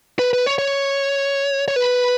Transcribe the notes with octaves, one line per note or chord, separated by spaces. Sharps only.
B4
B4
C#5
C#5
C#5
B4